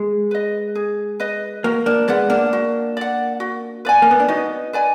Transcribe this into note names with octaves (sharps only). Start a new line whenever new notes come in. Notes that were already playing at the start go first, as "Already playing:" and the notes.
Already playing: G#3
B4 D#5
G#4
B4 D#5
A#3 F#4
A#3 D4
G#3 B3 D5 F#5
A#3 D4
F#4
D5 F#5
F#4
B4 D5 G#5
A#3
B3
D4
B3 D#4 F#4
B4 D5 G#5